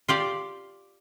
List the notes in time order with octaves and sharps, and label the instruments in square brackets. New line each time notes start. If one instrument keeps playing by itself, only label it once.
[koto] F4 G4 D5